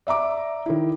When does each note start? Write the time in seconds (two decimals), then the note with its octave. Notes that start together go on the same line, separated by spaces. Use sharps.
0.07 D5 E5 A#5 D6
0.66 D#3 E4